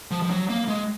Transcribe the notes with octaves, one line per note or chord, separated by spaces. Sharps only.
F3
F3
F#3
A#3
G#3